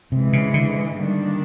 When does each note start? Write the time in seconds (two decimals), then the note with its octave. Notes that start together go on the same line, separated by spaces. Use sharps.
0.12 G#2 C3 E3 G#3
0.33 C#3
0.54 D3
0.95 D#3 G3 A#3 D4